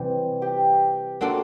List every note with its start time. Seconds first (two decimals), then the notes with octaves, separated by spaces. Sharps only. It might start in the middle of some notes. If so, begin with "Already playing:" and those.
Already playing: C3 E3 G3 C4
0.42 G4 G5
1.21 A#3 D4 F4 F#4 A4 D5 F#5